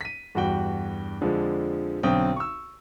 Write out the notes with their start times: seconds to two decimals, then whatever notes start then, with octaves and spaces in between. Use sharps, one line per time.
0.01 B6 D#7
0.35 E2 G2 F#4 G5
1.21 F2 D3 F3 G#3 D4
2.03 B1 D3 C4 G5 D#6
2.36 C#6 E6